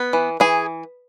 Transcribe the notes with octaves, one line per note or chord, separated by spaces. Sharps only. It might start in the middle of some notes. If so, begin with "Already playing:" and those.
Already playing: B3
E3
E3 G#4